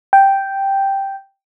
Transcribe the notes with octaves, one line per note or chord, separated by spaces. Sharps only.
G5